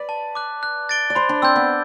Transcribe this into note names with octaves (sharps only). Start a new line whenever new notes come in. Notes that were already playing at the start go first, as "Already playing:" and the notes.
Already playing: B4 D5
A5
D6 F#6
F#6
A6 D7 G7
D5
C5 B5
D4
C4 E6 G6
B3